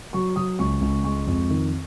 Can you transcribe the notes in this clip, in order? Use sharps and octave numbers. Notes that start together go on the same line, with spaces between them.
F#3 C#6
F#3 D#6
C#2 C#6
C#2
G#3 C#6
F2
D#3